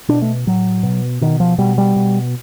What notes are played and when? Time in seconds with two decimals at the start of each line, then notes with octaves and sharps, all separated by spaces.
0.08 B2 D4
0.22 A3
0.47 A2 F#3
0.83 B2
1.21 B2 D#3
1.40 F3
1.58 B2 G3
1.78 G3
1.96 B2